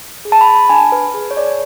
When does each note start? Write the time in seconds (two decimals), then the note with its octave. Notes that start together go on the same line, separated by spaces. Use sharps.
0.25 G#4
0.32 A5
0.41 B5
0.69 D4 G#5
0.92 B4
1.14 G#4
1.31 C#5
1.37 D5